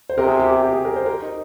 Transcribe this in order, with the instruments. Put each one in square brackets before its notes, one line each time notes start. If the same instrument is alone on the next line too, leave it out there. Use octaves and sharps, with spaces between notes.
[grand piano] C5
[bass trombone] C3 [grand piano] A#4
[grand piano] G#4
G4
G4
G4
G#4
A#4
C5
A#4
D#4